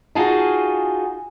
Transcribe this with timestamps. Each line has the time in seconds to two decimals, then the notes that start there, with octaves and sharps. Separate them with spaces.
0.15 D#4 F4 F#4 G#4 G#5 A5